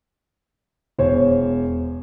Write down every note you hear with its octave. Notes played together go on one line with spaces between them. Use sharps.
E1 C5 C#5